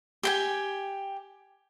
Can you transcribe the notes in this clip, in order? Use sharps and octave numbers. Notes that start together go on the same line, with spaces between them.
G4 G5 G#5